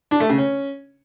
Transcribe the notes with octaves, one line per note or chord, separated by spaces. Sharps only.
D4
A3
C#3
C#4